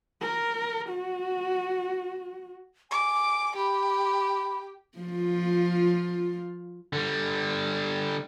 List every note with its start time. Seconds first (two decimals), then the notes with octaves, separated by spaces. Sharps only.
0.22 A#4
0.89 F#4
2.91 G#5 D6
3.56 G4 B5
4.98 F3 F4
6.93 D3 G3